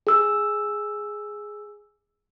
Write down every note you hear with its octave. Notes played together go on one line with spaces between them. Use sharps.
G#4 E6